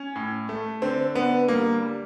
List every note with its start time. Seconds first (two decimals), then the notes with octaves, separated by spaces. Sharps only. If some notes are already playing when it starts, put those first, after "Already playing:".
Already playing: C#4
0.16 A2
0.49 A3
0.82 D3 C4
1.15 D3 B3
1.48 G3 A#3
1.82 G3